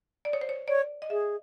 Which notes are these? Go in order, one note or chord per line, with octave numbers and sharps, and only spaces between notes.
D5
C#5
C5
C#5
C#5 D5
D#5
G#4 E5